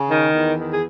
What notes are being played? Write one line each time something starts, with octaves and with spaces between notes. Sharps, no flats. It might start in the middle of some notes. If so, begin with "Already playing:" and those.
Already playing: C#3
D#3
E2
D#3
G#4